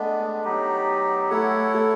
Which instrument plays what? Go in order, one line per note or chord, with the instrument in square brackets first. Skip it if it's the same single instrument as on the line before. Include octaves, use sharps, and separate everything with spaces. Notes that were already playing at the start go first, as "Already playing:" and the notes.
Already playing: [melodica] G#3 B3 D4 [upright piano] A3
[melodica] F#3 B3 D#4 G4
[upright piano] A3 [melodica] E4 A4 C#5 F#5
[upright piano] A3